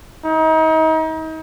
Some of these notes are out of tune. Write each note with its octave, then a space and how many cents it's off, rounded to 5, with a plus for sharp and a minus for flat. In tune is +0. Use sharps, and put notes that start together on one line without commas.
D#4 +35